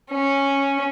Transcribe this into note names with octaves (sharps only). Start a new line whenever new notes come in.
C#4